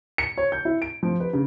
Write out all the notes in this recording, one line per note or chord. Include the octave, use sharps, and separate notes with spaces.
C#7
C#5
G6
E4
D7
F3
B4
C#3